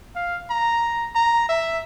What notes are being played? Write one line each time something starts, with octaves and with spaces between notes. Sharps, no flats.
F5
A#5
A#5
E5